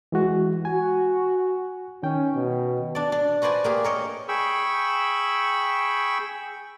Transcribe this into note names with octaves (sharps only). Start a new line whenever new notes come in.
E3 G#3 F#4
F#4 G#5
D#3 C#4 G5
B2
D4 D5
D4
F#4 B4 C5 D5 G#5
A#3 G4 G#4
A#4 C#5 D#5
G#4 G5 B5 C#6 E6